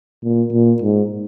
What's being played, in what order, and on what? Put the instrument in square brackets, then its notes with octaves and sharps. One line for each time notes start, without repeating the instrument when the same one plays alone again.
[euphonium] A#2
A#2
G#2